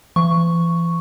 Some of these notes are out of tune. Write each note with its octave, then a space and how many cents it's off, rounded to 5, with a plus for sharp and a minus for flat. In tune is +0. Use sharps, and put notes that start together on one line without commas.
E3 +40 C#6 +0